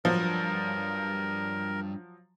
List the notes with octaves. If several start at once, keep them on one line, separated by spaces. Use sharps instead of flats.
G2 F3 F#3 D4 A#4